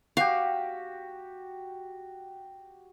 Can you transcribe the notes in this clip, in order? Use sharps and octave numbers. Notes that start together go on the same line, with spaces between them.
F#4 G4 F5